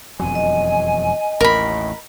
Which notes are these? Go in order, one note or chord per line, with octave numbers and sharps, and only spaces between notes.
E1 F2 F#3 G#5
D#5
A1 D#2 A2 A#4 B5